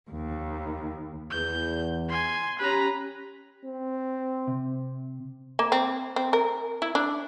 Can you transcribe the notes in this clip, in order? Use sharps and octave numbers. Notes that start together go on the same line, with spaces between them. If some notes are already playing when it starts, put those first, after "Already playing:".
D#2
E2 G6
G#5 C6
C#4 G4 B4 A#5
C4
C3
A#3
C4
C4
A#4
E4
D4